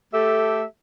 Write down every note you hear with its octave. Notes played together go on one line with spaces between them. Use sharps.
A3 G4 A4 E5